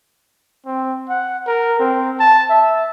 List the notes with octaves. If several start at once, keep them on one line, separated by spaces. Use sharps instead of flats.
C4
F#5
A#4
C4
A5
E5